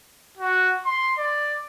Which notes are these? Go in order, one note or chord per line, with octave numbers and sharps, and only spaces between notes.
F#4
C6
D5